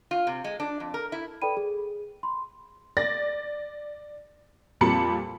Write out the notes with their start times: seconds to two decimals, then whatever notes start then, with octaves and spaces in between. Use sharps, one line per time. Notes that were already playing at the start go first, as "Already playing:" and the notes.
0.11 F4
0.27 C3
0.44 G#3
0.60 D4
0.80 F2
0.94 A#4
1.12 E4
1.42 A4 B4 D5 G5 B5 D#7
1.57 G#4
2.23 B5 C6
2.97 D5 A6 A#6
4.81 F2 A#2 G3 A5 B5 C#7